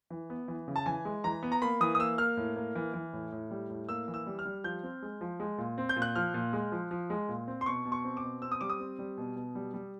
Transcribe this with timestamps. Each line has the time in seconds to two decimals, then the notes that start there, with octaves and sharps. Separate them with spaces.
0.10 E3
0.30 B3
0.48 E3
0.68 C#3
0.76 A5
0.86 E3 G#5
1.05 G#3
1.24 E3 A#5
1.43 B3
1.52 A#5
1.62 A#3 B5
1.80 E3 D#6
1.95 D#6
1.99 A#3 E6
2.18 A#3 F6
2.37 A2
2.56 A#3
2.75 E3
2.94 E3
3.13 A2
3.32 A2
3.51 G3
3.70 A2
3.89 A#3 E6
4.08 E3
4.14 E6
4.27 G3
4.39 F6
4.45 G3
4.64 F3 G6
4.83 C4
5.02 G#3
5.21 F3
5.40 G#3
5.58 A#2
5.78 C4
5.89 G6
5.96 A#2
6.02 F#6
6.16 F3 F6
6.34 A#2
6.53 G#3
6.72 F3
6.91 F3
7.10 G#3
7.29 A#2
7.47 C4
7.61 C6
7.66 B2 C#6
7.85 B2
7.92 C#6
8.04 C4
8.17 D6
8.23 B2
8.42 C4 E6
8.52 D#6
8.61 G3 D6
8.70 D#6
8.80 C4
8.99 G3
9.18 B2
9.36 B2
9.55 G3
9.74 G3